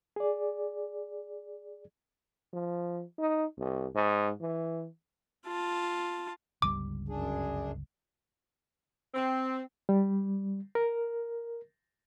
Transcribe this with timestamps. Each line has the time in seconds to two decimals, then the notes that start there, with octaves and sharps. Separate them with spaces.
0.16 G#4 D5
2.53 F3
3.18 D#4
3.57 C2
3.95 G#2
4.40 E3
5.47 F4 A5
6.62 G1 C#2 G3 D6
7.09 F#2 D4 G#4
9.15 C4
9.89 G3
10.75 A#4